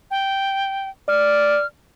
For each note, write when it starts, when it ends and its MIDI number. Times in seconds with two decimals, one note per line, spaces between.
0.11 0.89 79
1.08 1.62 74
1.08 1.66 89